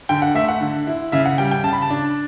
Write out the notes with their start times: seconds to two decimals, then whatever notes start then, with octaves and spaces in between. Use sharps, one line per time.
0.09 D3 G5
0.22 F#5
0.35 A3 E5
0.48 F#5
0.61 D3
0.87 E4
1.12 C#3 E5
1.25 F#5
1.38 G3 G5
1.51 G5
1.64 C#3 A5
1.73 B5
1.82 A5
1.90 D4